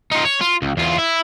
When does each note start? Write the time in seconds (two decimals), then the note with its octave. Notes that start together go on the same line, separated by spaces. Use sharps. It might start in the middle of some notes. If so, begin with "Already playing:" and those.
0.11 D#4 F4
0.25 C#5
0.41 F4
0.62 C#2
0.77 E2 F4
0.98 E4